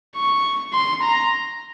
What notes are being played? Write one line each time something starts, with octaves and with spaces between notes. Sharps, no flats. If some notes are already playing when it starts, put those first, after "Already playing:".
C#6
C6
A#5